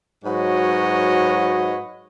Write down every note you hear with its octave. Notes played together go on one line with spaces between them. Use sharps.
G#2 F#3 F#4 B4 C#5 D#5